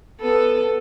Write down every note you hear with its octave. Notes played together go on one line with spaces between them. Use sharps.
B3 A4 B4